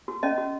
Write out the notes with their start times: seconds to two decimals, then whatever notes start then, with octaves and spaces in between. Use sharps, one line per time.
0.08 F#4
0.23 C#4 D#5
0.38 F#4